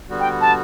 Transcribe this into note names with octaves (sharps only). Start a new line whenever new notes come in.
D3 G3 B3 F#4
G5
A5